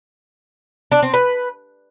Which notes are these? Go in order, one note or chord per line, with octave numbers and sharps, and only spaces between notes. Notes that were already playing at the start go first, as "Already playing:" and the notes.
D4
C4
B4